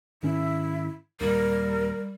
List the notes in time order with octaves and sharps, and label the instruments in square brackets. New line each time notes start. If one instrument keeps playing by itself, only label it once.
[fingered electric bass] G#2 D#3 C#4 [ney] E4
[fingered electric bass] D#2 A#2 [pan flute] G3 [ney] A#4